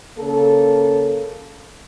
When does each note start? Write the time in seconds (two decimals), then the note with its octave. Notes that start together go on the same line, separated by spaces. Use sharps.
0.19 C#3 A#3 A4